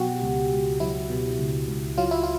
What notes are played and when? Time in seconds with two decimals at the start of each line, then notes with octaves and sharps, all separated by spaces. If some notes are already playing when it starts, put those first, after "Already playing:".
Already playing: B2 F#3 F#4 G4
0.22 C#2
0.52 C#2
0.80 F#3 E4
1.10 B2
1.39 C#2
1.68 C#2
1.98 F#3 F4
2.11 E4
2.23 F4